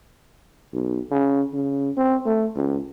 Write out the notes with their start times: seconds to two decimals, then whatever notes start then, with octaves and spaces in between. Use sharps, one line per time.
0.73 B1
1.11 C#3
1.54 C#3
1.97 C4
2.26 A3
2.56 C#2